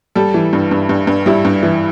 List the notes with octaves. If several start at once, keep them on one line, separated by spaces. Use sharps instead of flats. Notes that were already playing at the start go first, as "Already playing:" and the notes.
G3 A4
E3
G2
G2
G2
G2
G3 E4
G2
E3